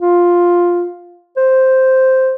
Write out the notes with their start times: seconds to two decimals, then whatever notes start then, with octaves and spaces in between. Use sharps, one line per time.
0.01 F4
1.37 C5